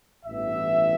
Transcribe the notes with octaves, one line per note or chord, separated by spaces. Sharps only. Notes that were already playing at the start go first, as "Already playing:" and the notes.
A1 G2 E3 B3 E5